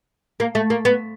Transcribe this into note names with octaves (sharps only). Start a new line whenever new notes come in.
A#3
A3
A#3
B3